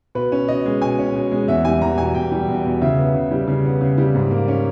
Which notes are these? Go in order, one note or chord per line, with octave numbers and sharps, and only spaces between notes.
B2 B4
C#4
B2 D#5
G#3
B2 G#5
C#4
B2
G#3
E2 E5
G3 G#5
E2 A#5
B2 G#5
E2 G5
G3
E2
B2
C#3 E5
B3
C#3
G3
C#3
B3
C#3
G3
G#2
A#3
C#4